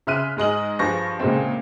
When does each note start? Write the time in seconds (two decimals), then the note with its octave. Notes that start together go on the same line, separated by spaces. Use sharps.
0.07 C#3 E5 C6 F6 F#6 D#7
0.37 G#2 G#3 D#5 F#7
0.79 G2 F3 G#4 B4 C#6 A#6
1.20 A#2 C#3 G#3 A3 C4